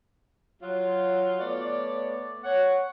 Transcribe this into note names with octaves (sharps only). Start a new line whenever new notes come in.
F#3 F4
A3 B3 C#5 D5
C#5 F#5